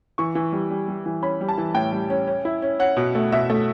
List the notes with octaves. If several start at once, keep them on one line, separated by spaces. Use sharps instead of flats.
E3 C#6
E3
G3
G3
G3
E3
C#4 B5
G3
A5
E3
A2 G5
G3
C#4
C#4
E4
C#4
C#4 F#5
B2
A3
B2 E5
A3